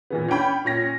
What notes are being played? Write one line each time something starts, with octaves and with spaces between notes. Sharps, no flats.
A#2 E3 B3
C#4 D4 G5 B5
A#2 C#4 A#6